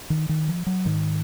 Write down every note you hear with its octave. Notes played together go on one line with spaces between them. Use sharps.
D#3
D#3
F3
F#3
G#2 D#3